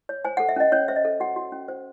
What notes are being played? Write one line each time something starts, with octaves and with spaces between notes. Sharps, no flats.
C#5
C5 G#5
F#5
A4
E5
C#4 D#5
C#4 C#5
C5 E5
D#5
A4
F#4 F#5
F#4
C#4
C5